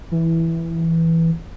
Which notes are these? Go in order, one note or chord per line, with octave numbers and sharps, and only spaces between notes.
E3